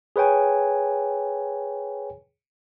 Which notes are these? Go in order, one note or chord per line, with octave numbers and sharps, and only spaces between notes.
G#4 B4 C#5 G5 G#5